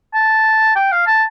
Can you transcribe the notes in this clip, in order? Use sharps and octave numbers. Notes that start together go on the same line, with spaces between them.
A5
G5
F5
A5